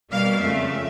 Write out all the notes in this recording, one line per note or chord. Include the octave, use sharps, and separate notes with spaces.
B2 G3 A#3 F5
F2 C#3 F3 A3 C4 E5